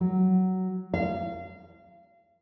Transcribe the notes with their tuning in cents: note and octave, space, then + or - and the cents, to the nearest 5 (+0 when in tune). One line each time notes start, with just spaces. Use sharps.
F#3 +10
F5 -30